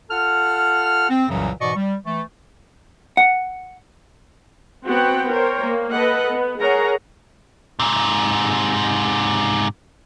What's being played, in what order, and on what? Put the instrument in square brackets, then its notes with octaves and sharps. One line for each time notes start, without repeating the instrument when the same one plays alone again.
[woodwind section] F4 A4 F#5 F6
C4
C2 F#2 A#2 C#3 E3 F#3
G#2 B2 E3 D5 D#5 C#6
G3
E3 A3
[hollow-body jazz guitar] F#5
[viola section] B3 C4 F#4 F#5 G5
A#4 C5 C#5 G5
A#3
A4 B4 D#5 F#5
B3
G#4 A#4 C#5 F#5 A#5
[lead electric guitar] G#2 C3